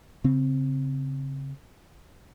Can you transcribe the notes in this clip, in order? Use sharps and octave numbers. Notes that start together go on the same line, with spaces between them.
C#3 C4